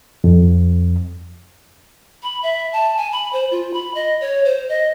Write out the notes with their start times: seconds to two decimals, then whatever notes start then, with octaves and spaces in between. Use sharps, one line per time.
0.24 F2
2.23 B5
2.43 E5
2.73 A5
2.97 G#5
3.12 B5
3.33 C5
3.51 F4
3.74 B5
3.95 D#5
4.21 C#5
4.45 C5
4.69 D#5